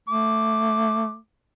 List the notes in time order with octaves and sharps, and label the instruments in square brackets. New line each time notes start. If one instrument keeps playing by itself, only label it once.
[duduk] A3 [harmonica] D6